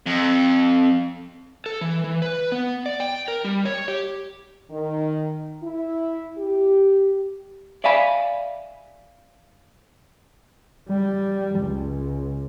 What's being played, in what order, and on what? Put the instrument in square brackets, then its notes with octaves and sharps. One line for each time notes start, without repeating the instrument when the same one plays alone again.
[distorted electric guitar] F2
[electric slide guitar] A4
E3
E3
B4
B3
D5
G5
A#4
G3
C#5
G4
[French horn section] D#3
E4
G4
[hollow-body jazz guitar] D5 E5 F5 G#5 B5
[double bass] G3
C#2